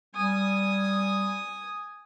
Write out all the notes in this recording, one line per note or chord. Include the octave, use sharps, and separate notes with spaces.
G3 G#5 D#6